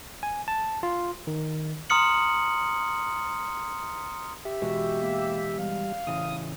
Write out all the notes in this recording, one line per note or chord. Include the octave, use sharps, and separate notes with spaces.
G#5
A5
F4
D#3
A#5 C6 D#6 F6 C#7 F#7
G4 E5
B2 E3 G#3 F#4
A#3
G3 F5
A1 C#3 E3 D#6